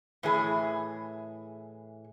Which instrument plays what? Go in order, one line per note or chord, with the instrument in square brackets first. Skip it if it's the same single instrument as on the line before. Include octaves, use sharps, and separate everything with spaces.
[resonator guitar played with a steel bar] A2 E3 G#4